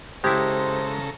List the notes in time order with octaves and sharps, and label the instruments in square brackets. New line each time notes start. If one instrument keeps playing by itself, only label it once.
[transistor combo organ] C#3 A4 A#5 [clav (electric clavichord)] G#3 E4 [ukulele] G4 [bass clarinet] C5